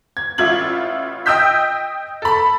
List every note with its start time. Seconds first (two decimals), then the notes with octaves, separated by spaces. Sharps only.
0.17 G#6
0.38 A1 E4 F4 G#6 F#7
1.26 D#5 G5 D#6 E6 G6 B6
2.22 A4 B5